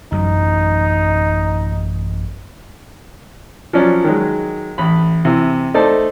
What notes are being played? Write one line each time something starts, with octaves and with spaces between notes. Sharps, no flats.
A1 F#2 F#3 D#4
F3 F#3 C#4 D5
D#3 F#3 G#3
A1 B5
C3 E3
A3 D#4 C5 D5 A5